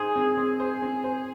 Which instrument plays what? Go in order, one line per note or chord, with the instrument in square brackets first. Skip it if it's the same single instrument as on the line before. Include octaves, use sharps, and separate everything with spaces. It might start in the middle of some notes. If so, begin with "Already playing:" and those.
Already playing: [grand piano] D#4 C5 [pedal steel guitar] G#4
[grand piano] C4
C4
C5
C4
C5